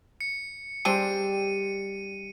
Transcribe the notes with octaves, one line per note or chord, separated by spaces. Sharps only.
C#7
G3 G#3 C4 D4 D#7